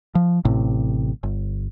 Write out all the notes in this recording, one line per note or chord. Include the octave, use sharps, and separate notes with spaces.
F3
A1 A2 C3
G1